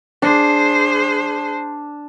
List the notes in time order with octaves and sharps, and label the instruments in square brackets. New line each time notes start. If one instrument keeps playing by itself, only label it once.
[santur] D4 [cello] G#4 C5